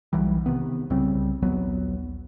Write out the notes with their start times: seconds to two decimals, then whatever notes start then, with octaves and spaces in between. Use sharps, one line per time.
0.13 B1 E3 F#3 G3
0.46 C3 D#3 B3
0.90 C2 C#3 G3 C4
1.42 A#1 D#2 F#3 B3